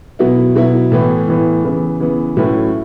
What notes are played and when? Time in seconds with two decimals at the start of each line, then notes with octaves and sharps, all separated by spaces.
0.19 B2 F#3 B3 E4
0.55 B2 F#3 B3 E4
0.92 A2 E3 B3
1.28 A2 E3 B3
1.64 C#3 E3 B3
2.00 C#3 E3 B3
2.37 A2 F#3 C#4 E4 B4